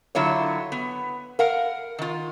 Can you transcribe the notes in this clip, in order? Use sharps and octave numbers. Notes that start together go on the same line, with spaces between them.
D3 F#3 E4 F4 C#5
B3
A#4 F5 F#5
D#3 F4